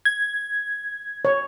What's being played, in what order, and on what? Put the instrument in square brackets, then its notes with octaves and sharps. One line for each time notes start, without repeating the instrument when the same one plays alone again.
[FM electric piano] G#6
[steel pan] C#5